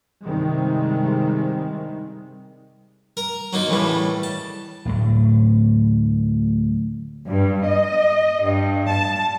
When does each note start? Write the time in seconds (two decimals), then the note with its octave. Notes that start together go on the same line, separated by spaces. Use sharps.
0.24 G2 C3 D#3 G3 G#3
3.17 A#4 A#5
3.53 F#3 A#3 D#4 F4
3.69 A2 C#3 E3 G3
4.23 A5
4.85 D1 A2 F#3
7.28 G2
7.65 D#5
8.44 G2
8.88 A5